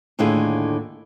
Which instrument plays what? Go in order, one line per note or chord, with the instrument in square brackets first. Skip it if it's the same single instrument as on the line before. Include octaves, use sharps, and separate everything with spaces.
[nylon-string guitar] D#2 A2 D3 F4 G#4